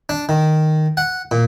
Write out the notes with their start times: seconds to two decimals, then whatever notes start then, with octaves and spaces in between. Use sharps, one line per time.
0.09 D4
0.29 D#3
0.97 F#5
1.31 A#2